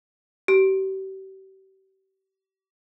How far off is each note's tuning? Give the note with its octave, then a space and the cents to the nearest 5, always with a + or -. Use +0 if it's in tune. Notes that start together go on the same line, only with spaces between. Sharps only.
G4 -40